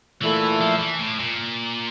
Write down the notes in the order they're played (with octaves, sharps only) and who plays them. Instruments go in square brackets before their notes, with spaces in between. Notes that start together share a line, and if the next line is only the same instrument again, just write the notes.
[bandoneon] A#2 A3 E4 A4 [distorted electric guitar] E3
[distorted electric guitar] F3
E3
A2
A#2